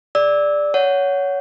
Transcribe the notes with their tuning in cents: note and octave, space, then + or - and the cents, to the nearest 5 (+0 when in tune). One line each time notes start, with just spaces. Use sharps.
G#4 +0 D5 +0 E6 -20
C#5 +20 F#5 +0